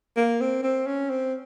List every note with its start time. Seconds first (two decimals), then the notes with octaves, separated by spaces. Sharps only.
0.17 A#3
0.41 C4
0.63 C4
0.87 C#4
1.10 C4